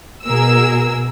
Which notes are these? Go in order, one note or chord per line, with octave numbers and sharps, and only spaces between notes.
B2 G#4 A#4 E6